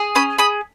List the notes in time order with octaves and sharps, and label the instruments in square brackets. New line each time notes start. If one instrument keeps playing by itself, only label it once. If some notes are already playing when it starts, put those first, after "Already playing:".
Already playing: [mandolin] G#4
C#4 B5 D#6
G#4 B5 D#6